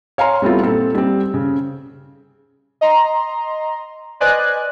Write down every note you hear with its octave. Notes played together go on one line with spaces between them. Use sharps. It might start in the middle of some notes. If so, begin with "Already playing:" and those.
C#5 F5 G#5 A#5 C6
G3 A3 B3 C4 E4 F4
A#2 C4 A4
G3 C4
C#3
D#5 A#5 C6
B4 C5 D5 D#5 G#5 F#6